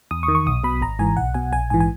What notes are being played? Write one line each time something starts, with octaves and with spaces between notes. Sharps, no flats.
E2 D#6
C#6
D#3
C#6
B1 D#6
B2 B5
G#1 A#5
G#2 E3 G#5
B1 F#5
B2 G#5
A#1 G#5
G#2 E3 G#5
G#5